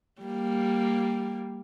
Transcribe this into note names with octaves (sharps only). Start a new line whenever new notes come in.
G3 A#3